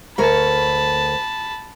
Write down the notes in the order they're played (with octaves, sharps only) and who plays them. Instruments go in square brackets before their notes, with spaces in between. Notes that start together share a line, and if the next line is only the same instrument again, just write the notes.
[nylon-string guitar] D2 A#4 C#5 [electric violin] A5 B5